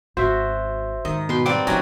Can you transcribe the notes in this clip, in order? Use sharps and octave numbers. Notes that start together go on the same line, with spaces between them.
G#1 F#4 C5 E5
G#2 D#3 D#5
B2 B4 G5 C6
G3 A#3 C4 D5 F#5 D6
F#2 A#2 D#3 D#5 E5